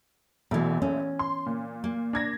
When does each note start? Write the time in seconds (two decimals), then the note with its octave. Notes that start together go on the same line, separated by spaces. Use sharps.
0.51 A#1 B2 E3 A3
0.82 C#4
1.19 C6
1.46 A#2
1.84 A#3
2.13 D4 G#6 A#6